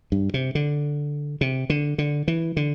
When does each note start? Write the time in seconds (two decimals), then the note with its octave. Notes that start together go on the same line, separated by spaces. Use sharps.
0.12 G2
0.34 C3
0.55 D3
1.41 C3
1.70 D3
1.98 D3
2.28 E3
2.57 D3